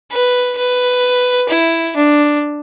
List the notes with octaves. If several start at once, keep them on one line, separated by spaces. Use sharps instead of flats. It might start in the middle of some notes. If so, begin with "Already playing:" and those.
B4
B4
E4
D4